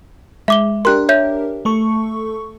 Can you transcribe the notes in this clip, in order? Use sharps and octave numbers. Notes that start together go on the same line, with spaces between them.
G#3 E5 D6 G7
D4 G4 A#4 C6 F#6
C#5 E5 G6
A3 A4 C#6